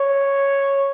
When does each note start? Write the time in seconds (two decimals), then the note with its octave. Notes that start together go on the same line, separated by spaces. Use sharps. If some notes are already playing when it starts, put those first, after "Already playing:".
Already playing: C#5